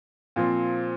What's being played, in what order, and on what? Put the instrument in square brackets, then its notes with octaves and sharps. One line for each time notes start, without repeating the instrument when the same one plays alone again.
[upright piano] A#2 F3 C4